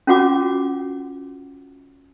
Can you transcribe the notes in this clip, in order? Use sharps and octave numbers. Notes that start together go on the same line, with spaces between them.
C#4 F4 F#4 F#5 D6